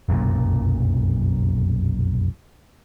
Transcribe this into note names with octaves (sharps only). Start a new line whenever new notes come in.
F1 B1 F#2 A#2